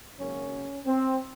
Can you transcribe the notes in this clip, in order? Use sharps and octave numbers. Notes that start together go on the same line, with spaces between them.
G#1 F#2 C#3 F#3 A#3 C#4
C4